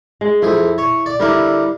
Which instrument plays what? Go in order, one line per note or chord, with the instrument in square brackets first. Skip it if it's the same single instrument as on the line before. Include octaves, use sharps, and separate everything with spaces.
[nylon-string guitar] G#3
[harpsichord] F2 G#4 [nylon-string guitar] E4
[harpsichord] C#5
D5
[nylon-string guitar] D3 E4 [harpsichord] G3 A#4 D6